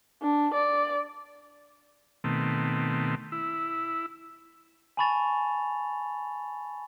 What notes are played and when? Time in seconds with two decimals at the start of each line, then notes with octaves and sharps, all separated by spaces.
0.22 D4
0.53 D5
2.24 B2 D#3 A3 C4
3.32 E4
4.97 G#5 A5 B5 C#6 A6 F7